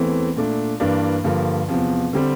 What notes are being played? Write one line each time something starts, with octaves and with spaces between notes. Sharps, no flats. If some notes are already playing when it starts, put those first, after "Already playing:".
Already playing: E2 E3 A3 C4
A#2 A3 D4
G2 E3 A#3 D4
G2 D3 F3 A#3
E2 C3 F3
D3 G3 C4